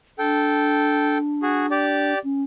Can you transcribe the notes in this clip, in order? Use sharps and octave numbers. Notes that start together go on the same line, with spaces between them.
D4 A4 G5
F#4 G#4
G4 D5
C#4